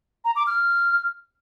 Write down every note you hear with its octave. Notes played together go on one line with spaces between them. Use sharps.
A#5
D6
F6